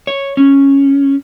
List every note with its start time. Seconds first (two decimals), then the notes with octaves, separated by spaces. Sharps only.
0.07 C#5
0.37 C#4